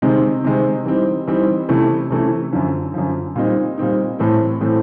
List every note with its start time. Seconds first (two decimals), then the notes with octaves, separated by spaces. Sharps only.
0.02 C3 D#3 G#3 C4
0.44 C3 D#3 G#3 C4
0.86 E3 G3 C4 D#4
1.28 E3 G3 C4 D#4
1.69 C3 E3 A3 C#4 E4
2.11 C3 E3 A3 C#4 E4
2.53 F#2 D3 F3
2.94 F#2 D3 F3
3.36 A#2 G3 C4 D#4
3.77 A#2 G3 C4 D#4
4.19 A2 E3 A3 C4
4.61 A2 E3 A3 C4